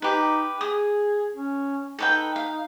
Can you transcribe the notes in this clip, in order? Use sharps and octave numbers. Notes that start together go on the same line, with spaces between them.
D#4 G4 B4
G#4 D#6
C#4
D#4 A4 B4 G5
F5